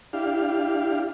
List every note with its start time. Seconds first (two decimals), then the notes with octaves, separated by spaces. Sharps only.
0.13 D4 E4 G4 F5